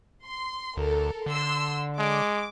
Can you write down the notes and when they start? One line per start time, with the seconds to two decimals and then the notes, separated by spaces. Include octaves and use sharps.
0.24 C6
0.77 D2 A4 A#4
1.26 D3 C6 E6
1.99 G#3 D6